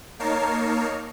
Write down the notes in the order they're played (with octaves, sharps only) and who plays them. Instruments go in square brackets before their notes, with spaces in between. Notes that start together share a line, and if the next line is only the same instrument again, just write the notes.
[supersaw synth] A#3 D#4 A#4 C#5 A5 C7